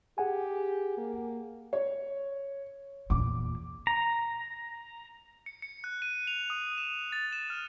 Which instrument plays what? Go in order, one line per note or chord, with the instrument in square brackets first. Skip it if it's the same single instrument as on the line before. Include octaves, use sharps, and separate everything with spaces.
[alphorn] G4 [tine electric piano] G#4 F#5 G#5
[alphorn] A#3
[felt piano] C#5
[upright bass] E2 A#2 [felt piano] D6
[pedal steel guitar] A#5
[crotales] C#7
C#7
F#6
D#7
F7
D#6
E7
A6
E7
F6